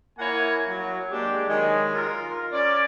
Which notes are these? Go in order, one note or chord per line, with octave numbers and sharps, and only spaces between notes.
A#3 E4 C#5 F#5 G#5
F#3
G#3 A#3 D4 G4
D#3 F#3 G#3
F4 A#4
C#4 D5